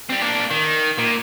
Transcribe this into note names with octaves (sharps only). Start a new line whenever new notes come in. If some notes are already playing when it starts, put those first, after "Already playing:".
G3 C4
A#3 D4
D#3
A#2